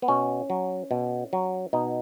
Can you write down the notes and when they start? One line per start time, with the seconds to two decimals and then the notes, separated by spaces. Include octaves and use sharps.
0.02 B3
0.08 B2 C#4
0.50 F#3
0.91 B2
1.33 F#3
1.73 B2 D#4